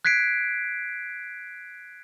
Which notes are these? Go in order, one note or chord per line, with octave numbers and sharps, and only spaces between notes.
F#6 G#6 B6 C7 D7